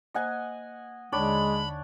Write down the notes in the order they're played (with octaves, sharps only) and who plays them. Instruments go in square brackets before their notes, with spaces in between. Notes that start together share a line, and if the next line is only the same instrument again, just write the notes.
[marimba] A#3 C5 [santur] D#5 F#5 G#5
[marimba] D#2 D3 [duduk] G#3 [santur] D4 C#5 D5 [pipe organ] B5